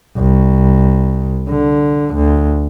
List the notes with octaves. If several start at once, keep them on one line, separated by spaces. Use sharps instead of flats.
C2
D3
D2